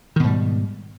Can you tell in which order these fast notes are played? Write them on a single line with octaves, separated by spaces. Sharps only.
D#3 B2 G#2 G3